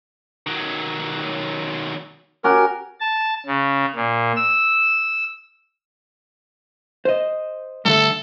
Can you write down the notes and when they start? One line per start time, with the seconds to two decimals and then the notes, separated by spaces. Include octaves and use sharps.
0.47 D#3 F#3
2.44 C#4 F#4 G4 A#4
3.00 A5
3.46 C#3
3.96 A#2
4.36 E6
7.05 C5 D#5
7.85 G2 D3 A3 A4